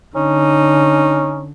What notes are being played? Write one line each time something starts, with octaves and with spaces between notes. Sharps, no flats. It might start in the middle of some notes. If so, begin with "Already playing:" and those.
D3 C#4 D#4